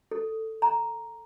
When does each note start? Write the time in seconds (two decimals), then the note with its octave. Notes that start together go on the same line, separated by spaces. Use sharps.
0.12 A4
0.62 A#5